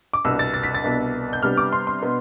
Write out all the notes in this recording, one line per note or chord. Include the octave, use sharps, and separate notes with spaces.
D6
C2 B2 B3 D4 E6
A6
A6
B6
A6
C2 B2 B3 D4
G6
C3 G3 B3 D4 F6
D6
C6
C6
B2 B3 D4